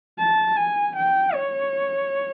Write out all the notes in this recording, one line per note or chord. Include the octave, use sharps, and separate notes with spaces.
A5
G#5
G5
C#5